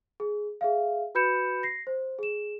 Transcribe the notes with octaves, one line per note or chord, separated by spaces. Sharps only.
G#4
G#4 E5 F5
F#4 B4 B5 G6 C#7 E7
A#6 C7
C5
G#4 E7